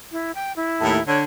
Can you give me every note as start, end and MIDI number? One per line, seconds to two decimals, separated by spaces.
0.12 0.32 64
0.35 0.52 79
0.56 1.05 64
0.81 0.98 39
0.81 0.98 45
1.07 1.24 50
1.07 1.19 73